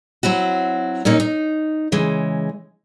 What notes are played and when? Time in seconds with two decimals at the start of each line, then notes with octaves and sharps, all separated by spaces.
0.23 F#3 C4 E4 F#4
1.05 A#2 A#3 C#4 D#4
1.20 D#4
1.92 C#3 E3 G#3